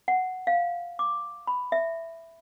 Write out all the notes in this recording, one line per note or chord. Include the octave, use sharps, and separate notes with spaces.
F#5
F5
D6
B5
E5